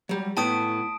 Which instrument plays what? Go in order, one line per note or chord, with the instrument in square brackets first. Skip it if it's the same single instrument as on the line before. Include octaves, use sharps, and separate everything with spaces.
[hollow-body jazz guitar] F#3 G3
[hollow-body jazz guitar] A2 B3 G5 [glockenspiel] A5 D#6 D7